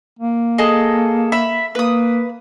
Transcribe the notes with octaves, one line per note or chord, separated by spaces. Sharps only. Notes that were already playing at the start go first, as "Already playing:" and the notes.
A#3
G#4 A4 D#5
E5 B5
A#3 B4 D#6